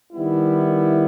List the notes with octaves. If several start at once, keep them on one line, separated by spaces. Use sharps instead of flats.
D#3 G3 B3 E4